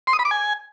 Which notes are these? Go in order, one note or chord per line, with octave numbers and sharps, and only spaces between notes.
C6
D#6
B5
D6
G#5